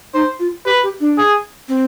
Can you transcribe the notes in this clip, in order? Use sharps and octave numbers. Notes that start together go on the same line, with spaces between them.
D#4 C5
F4
G4 B4
G4
D4
G#4
C4